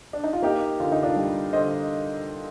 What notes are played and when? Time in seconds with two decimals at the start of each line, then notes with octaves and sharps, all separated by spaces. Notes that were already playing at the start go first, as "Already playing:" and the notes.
0.13 D4
0.24 D#4
0.33 F4
0.42 A#3 D#4 G4
0.80 D3 F4
0.92 D#4
1.03 D4 F4
1.16 G3
1.53 D3 C5 D#5